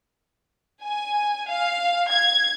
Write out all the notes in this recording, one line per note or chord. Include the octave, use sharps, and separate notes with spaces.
G#5
F5
G#6